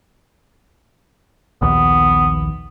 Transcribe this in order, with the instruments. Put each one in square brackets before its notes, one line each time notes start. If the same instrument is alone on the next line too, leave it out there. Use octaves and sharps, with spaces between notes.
[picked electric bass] A#1 D#2 [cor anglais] B3